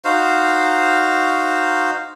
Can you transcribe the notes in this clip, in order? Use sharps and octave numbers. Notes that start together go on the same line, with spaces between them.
D#4 F#4 C5 F5